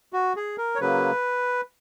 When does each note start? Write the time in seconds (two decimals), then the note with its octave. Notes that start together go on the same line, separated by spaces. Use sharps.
0.13 F#4
0.36 G#4
0.58 A#4
0.75 C#5
0.80 C#3 F#3 A#3 B4